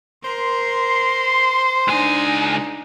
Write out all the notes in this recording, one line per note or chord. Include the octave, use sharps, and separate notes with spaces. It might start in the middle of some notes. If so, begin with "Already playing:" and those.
A#4 C5 C6
C#2 D4 D#4 G#5